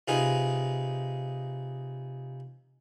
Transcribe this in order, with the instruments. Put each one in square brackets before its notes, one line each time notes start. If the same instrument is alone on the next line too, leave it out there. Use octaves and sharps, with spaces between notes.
[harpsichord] C3 D#4 F4 G#4 B4